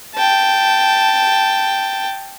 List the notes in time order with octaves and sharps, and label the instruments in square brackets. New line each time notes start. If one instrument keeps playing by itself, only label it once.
[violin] G5 A5